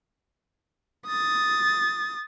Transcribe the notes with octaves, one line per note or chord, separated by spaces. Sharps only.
D#6 A6